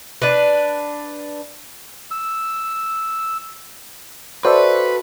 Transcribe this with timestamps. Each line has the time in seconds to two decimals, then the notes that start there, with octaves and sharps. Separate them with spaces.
0.22 D4 B4
2.11 E6
4.45 F#4 A4 B4 C5 D5 E5